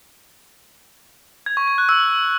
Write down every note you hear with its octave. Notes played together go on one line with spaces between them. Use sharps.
G#6
C#6
G#6
F#6
E6